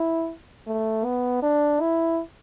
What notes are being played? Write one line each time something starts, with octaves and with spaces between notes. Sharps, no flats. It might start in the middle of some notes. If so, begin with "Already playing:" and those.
Already playing: E4
A3
B3
D4
E4